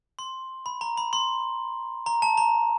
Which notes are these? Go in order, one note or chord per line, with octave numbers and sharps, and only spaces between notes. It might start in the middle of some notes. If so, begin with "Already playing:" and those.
C6
B5
A#5
B5
C6
A#5
A5
A#5